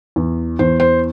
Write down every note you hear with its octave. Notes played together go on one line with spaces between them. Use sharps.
E2
E2 C5
C5